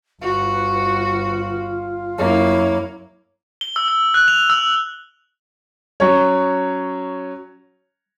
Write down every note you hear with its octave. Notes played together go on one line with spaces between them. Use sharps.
G1 F4 F#4 B4
F#2 A#3 E4 C#5
G7
E6
E6
F#6
F7
E6
F#3 C#4 C#5